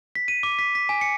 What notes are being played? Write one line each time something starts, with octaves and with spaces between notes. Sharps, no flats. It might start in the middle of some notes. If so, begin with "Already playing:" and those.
B6
D#7
D6
B6
B6
G#5
C#7